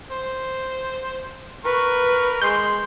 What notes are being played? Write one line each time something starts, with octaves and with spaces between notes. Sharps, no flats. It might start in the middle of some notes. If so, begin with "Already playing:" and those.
C5
A#4 B4 B5 C#6
G#3 C6 G6